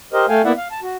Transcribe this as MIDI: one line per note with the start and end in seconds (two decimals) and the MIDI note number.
0.13 0.26 67
0.13 0.26 70
0.13 0.26 72
0.13 0.26 75
0.29 0.42 57
0.29 0.42 69
0.29 0.42 77
0.29 0.42 79
0.29 0.42 80
0.45 0.53 58
0.45 0.53 59
0.45 0.53 64
0.45 0.53 74
0.45 0.53 76
0.45 0.53 78
0.57 0.68 77
0.71 0.80 81
0.83 0.97 66